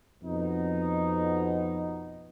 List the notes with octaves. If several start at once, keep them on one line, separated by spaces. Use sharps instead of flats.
F2 B2 D#4